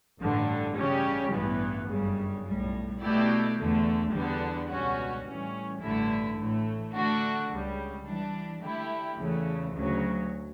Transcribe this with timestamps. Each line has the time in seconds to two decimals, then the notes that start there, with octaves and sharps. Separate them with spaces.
0.21 A1 G2 D3 G3
0.77 C#3 G3 C#4 G4
1.33 A1 G2 E3 B3
1.89 G1 F#2 C#3 G3
2.45 B1 A2 G3
3.02 B2 A3 E4 G4 D5
3.58 E2 D3 A3
4.14 E2 D3 G3 B3 D4
4.69 C#2 B2 G3 C#4 F#4
5.26 A2 E3 G3 C#4
5.82 A1 G2 D3 A3 E4
6.38 A2 E3 A3
6.93 D3 A3 D4 F#4
7.50 C#2 C#3 G3
8.06 E3 G3 D4
8.62 D3 A3 E4 G4
9.18 E2 C#3 E3 A3
9.74 D2 C#3 F#3